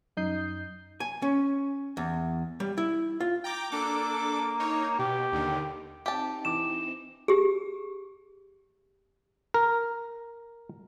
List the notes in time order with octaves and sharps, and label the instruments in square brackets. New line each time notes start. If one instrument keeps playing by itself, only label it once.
[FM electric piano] F#2 D#4 D#6 G6 C7
[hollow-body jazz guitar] G#5
C#4
E2
G3
E4
F4
[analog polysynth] G5 A#5 D6
[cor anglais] A#3 [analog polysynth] D4 A4 D6
[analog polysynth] D#4 C#5
[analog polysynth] B2 [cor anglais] G4
[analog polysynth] D#2 D3 D#3
[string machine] C4 D#4 [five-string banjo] G4 A5
[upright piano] E3 D6 [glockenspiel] E7
[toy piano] G4 G#4
[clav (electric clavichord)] A#4